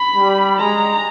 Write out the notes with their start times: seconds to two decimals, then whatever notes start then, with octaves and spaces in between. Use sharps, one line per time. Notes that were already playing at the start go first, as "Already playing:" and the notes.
Already playing: B5
0.16 G3
0.58 G#3 A#5